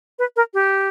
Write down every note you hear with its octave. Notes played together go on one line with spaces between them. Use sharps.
B4
A#4
G4